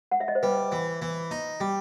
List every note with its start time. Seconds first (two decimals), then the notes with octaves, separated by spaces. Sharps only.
0.11 F#5
0.20 E5
0.28 D#5
0.35 C5
0.43 G3 B4
0.72 E3
1.02 E3
1.31 D#4
1.60 G3